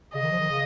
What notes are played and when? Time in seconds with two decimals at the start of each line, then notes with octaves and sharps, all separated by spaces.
0.14 C#3 D#5
0.23 D#3
0.31 F3
0.40 D#3
0.49 C#3